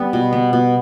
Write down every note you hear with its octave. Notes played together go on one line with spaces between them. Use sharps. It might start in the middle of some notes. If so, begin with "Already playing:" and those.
Already playing: G3 B3
B2
B3
B2